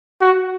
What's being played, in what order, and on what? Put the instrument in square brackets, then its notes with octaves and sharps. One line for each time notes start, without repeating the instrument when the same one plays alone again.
[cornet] F#4